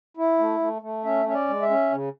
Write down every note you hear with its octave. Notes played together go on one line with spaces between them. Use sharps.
E4
A3
A3
A3
C#4 E5
C#4 E5
D5
G#3
E5
C#4
C#3